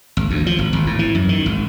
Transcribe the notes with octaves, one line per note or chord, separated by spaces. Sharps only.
G#1
D2
F3
G#1
G#1
A2
E3
F#2
D#3
G#1